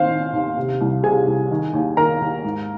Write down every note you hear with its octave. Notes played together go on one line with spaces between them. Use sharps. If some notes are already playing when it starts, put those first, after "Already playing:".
Already playing: D#3 C4 C5 F5 C6
D#3
D#2
C3
C2
C3 G#4 G#5
C2
D#3
D#2
D#3 A#4 A#5
D#2
G#2